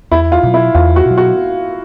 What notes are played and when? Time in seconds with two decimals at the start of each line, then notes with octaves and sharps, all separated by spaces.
0.11 E2 E4
0.32 F4
0.43 B2 F#3
0.54 E4
0.74 E2 F4
0.96 F#4
1.06 B2
1.11 F#3
1.18 F#4